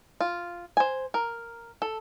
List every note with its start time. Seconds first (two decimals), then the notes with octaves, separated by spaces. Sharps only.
0.21 F4
0.77 C5 G#5
1.14 A#4
1.82 A4